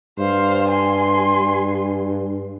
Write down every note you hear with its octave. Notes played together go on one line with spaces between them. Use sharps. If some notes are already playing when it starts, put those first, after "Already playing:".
G2 C5 F5
G#5 C6